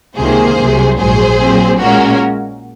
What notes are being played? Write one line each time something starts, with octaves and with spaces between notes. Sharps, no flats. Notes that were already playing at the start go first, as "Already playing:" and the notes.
C#2 C3 D#3 A#3 G#4 C5
C2 C3 F#3
A#1 G#2 F#3 G#4 C5
A#2 F#3 C4
A#2 G#3 C#4 F#4 A#4